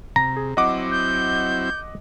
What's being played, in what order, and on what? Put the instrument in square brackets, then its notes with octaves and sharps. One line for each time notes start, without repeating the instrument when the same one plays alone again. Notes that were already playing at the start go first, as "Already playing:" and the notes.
[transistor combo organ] C3 [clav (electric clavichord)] A#5
[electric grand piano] G#4
[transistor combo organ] F#3 C4 E4 [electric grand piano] D#5 F#5 D6
[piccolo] G6